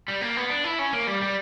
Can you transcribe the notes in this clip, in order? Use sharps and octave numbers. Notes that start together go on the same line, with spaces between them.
G3
A#3
B3
D4
E4
C#4
A#3
G3
G3